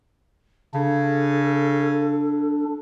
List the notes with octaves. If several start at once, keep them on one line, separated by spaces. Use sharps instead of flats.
C#3 D4 A4